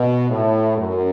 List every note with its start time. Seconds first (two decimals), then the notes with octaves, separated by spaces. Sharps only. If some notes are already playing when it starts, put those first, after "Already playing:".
Already playing: B2
0.29 A2
0.77 F#2